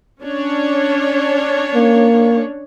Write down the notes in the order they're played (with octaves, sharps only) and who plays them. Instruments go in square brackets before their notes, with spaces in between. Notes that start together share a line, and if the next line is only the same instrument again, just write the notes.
[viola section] C#4 D4 C#5
[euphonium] A#3